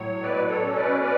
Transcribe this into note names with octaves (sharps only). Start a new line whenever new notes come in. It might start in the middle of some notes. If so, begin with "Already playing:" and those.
Already playing: A2 F#3 C#5
B2 B4 D5
A4 C#5
C#4
B4 D5
B2 B4 D5